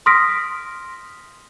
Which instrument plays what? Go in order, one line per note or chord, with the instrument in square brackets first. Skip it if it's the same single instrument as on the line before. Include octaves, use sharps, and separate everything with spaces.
[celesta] C6 D#6 F6 A#6 B6 D7